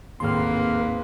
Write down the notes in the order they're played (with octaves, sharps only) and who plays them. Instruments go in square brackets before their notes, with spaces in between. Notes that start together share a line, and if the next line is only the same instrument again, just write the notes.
[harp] G#1 D#2 A2 [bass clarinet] A#3 [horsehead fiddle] C4 B4 [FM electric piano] C6 F6